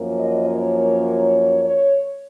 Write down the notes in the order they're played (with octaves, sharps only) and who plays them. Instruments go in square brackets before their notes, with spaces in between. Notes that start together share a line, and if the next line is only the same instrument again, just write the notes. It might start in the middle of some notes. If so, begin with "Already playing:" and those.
Already playing: [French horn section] F#2 F3 A#3 C#4
D#5
C#5
C#5
C#5